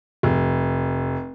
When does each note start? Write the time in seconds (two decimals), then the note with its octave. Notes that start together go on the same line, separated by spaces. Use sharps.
0.23 F1